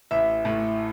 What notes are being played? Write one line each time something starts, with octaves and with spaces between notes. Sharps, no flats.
A1 E5
A2 A3